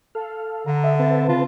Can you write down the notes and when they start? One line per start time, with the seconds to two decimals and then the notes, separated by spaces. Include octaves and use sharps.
0.15 A4 F5
0.66 D3 A#5
0.84 A4 D#5 E5
0.99 C4 B4 A5
1.29 C#3 F4